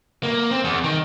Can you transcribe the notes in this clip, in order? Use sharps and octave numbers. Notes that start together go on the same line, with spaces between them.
A#3
C4
E2
D#3